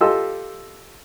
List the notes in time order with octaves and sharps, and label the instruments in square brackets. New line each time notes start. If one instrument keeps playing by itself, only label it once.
[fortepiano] F4 G4 A4 D#5 C6 E6